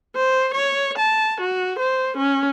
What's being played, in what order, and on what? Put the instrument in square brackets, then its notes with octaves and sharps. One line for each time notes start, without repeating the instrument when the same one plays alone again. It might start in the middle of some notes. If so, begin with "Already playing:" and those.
[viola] C5
C#5
A5
F#4
C5
C#4